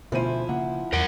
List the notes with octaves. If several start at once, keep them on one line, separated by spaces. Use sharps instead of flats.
D2 B2 F3 B3 E4 C5 D#7
C#3 A#3 F#5
E2 A#4 F#5 D7